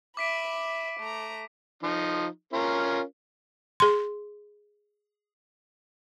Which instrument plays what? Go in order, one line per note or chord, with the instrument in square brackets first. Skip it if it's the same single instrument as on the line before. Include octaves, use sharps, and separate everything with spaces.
[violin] E5 B5 [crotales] D6 B6 D7
[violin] A3 A#5
[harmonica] F3 D#4
C#4 F4 A#4
[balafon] G#4 C6